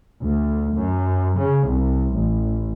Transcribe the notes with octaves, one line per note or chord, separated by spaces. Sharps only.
D2
F#2
C#3
C2
A1